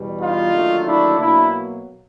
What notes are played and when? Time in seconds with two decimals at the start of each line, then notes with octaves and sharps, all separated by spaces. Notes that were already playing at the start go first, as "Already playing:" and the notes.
Already playing: E2 B2 G3
0.21 D#4 F4
0.54 D#2 D3 F#3 A3
0.87 D4 E4
1.19 B2 F#3 A#3 D4 E4